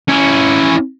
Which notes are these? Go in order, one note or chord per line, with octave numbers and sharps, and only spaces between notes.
C#4 E4